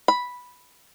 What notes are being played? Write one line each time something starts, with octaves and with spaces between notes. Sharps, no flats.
B5